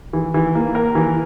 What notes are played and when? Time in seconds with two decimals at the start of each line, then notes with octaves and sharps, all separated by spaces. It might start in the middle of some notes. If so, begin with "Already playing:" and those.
0.13 E3
0.34 E3
0.55 A#3
0.75 A#4
0.95 E3